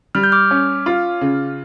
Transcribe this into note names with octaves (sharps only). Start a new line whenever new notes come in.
G3 F6
G6
D6 F6
C#4
F4
C#3